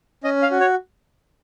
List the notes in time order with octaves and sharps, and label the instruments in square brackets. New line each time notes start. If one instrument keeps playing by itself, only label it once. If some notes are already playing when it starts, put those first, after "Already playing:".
[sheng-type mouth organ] C#4 D#5
F5
F#4
C#5